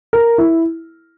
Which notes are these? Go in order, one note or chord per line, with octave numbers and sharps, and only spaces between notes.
A#4
E4